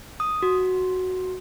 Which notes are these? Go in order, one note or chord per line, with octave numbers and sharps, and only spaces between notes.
D#6
F#4